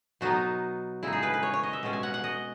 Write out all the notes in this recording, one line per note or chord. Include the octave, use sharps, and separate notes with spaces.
B2 F#3 B3 D#4 F#4
C#3 G#3 D#4 E4
G#4
B4
B4
C#5
C#5
D#5
E5
B2 G#3 C#4
G#5
F#5
F#5
D#5